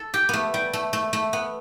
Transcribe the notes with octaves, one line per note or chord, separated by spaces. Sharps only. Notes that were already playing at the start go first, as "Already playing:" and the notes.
Already playing: A4
G4
A3 B3
G3
A3
A3
A3
B3